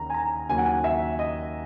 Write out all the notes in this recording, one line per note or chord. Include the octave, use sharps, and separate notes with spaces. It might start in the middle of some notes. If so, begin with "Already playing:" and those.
Already playing: D#2 C#3 A#5
G#5
A#5
D#2 C#3 F#3 A#3 G#5
F#5
G#5
E5
D#5